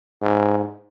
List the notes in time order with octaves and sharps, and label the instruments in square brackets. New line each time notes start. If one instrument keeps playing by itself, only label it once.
[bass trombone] G#2